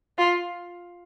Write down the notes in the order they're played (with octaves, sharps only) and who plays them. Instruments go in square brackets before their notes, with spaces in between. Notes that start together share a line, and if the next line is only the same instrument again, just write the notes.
[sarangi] F4